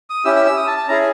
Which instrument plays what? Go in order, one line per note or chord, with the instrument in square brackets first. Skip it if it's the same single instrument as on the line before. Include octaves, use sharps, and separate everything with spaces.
[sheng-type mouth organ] D#6
C#4 E4 G4 E6
E6
E6
D#6
A5
A5
C#4 E4 G#4 A#5